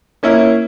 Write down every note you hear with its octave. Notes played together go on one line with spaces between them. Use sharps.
A#3 C#4 E4